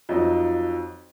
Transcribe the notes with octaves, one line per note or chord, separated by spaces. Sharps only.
F2 F#3 D#4